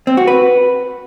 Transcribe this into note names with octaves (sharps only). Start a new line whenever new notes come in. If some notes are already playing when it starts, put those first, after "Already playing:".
C4
F#4
B4